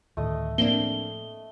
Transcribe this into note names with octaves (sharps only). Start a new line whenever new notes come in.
D2 A2 D#3 A3 D#5
A2 F3 A#3 C4 D4 G7